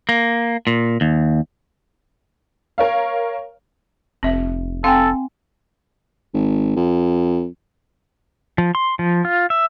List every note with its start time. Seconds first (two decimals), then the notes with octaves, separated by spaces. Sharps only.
0.09 A#3
0.67 A#2
1.01 D#2
2.78 A#4 C#5 F5
4.23 F1 C4 E5
4.84 C4 A4 F5 G5 G#5
6.34 G#1
6.76 F2
8.58 F3
8.75 C6
8.99 F3
9.25 F4
9.50 E5